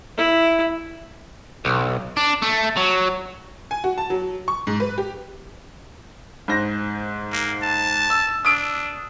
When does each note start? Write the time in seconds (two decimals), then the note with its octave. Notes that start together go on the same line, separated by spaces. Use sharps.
0.18 E4 E5
1.65 B1
2.17 D4
2.42 A3
2.77 F#3
3.71 G#5
3.84 F#4
3.98 A5
4.10 F#3
4.48 C#6
4.67 G#2
4.80 B4
4.98 G4
6.48 G#2 C5 A#6
7.32 A#3
7.62 A5
8.10 E6
8.45 D4 D#6 E6 D7